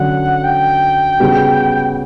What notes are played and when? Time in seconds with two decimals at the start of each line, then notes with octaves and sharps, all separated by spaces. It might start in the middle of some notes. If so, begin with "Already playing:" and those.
Already playing: D3 F#3 C#4 F#5
0.44 G5
1.20 C#3 G3 B3 F#4